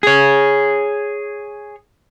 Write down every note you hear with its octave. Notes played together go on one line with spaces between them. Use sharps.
G#4 C#5